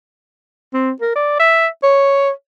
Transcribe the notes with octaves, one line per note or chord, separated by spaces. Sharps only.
C4
A#4
D5
E5
C#5